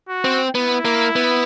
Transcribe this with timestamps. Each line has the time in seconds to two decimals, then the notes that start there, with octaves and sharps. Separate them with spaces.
0.09 F#4
0.24 C4
0.54 B3 E4
0.85 A#3
1.16 B3